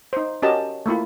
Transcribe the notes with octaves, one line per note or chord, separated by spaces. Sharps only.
D#4 C5
C#4 F#4 G4 A#4 D#5 A5
A3 A#3 E4 F4